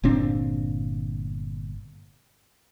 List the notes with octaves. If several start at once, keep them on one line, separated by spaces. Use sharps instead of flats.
G1 A#2 C4 D4